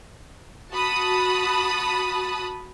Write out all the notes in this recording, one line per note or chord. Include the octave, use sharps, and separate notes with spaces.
F#4 A5 B5 D#6